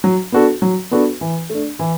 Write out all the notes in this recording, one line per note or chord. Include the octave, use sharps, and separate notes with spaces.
F#3
B3 D4 F#4 A4
F#3
B3 D4 F#4 A4
E3
A3 D4
E3